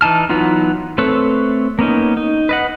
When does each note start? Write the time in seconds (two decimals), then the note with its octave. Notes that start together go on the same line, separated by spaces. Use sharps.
0.01 E3 D#4 A5 F6
0.29 E3 F#3 B3 D#4 F4
0.98 A3 C4 A4 B4 C#5
1.79 A#3 B3 C#4 D#4
2.17 D#4
2.49 B4 D#5 F#5